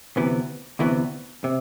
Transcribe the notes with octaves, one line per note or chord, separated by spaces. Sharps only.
D2 C3 E3 B3
D2 C3 E3 B3
C3